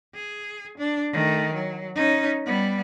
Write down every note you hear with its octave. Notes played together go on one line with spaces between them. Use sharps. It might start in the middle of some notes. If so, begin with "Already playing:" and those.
G#4
D4
D#3 A3
F#3
C#4 D#4
G3 B3